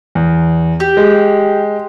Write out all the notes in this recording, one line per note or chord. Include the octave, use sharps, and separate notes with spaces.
E2
G4
G#3